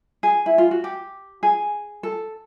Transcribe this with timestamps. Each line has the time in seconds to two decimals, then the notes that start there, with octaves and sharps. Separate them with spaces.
0.23 G#4
0.46 E4
0.58 F4
0.71 F#4
0.84 G4
1.43 G#4
2.03 A4